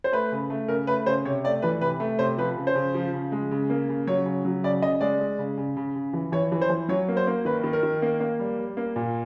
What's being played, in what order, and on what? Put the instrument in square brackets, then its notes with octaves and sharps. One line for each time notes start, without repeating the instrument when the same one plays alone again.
[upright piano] C5
A3 B4
C#3
A3
C#3 A#4
A3 B4
C#3 C5
C3 C#5
A3 D5
E3 B4
C3 B4
A3
C3 C5
F3 B4
C#3
C5
C#3
F3
C#3
G#3
C#3
A#3
C#3
F#3 C#5
C#3
F#3
C#3 D5
C#3 D#5
G#3 D5
G#3
C#3
C#3
C#3
C#3
E3
E3 C#5
E3
C5
E3
F#3 C#5
A#3
C5
A#3
D#3 B4
D#3
A#4
D#3
A#3
A#3
G3
G3
A#3
A#2